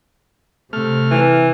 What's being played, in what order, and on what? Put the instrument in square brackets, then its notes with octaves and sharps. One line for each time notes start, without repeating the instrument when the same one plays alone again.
[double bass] C3 [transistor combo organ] A3 F6
[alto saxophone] E3